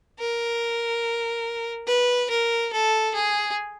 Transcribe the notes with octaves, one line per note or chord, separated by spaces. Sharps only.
A#4
B4
A#4
A4
G#4